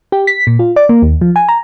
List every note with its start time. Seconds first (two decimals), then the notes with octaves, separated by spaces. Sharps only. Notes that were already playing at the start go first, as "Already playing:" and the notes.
0.12 G4
0.27 B6
0.47 A#2
0.59 F4
0.76 D5
0.89 A#3
1.02 D#2
1.21 F3
1.36 G#5
1.49 A#5